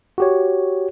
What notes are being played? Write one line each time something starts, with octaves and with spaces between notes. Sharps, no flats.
F#4 G4 C#5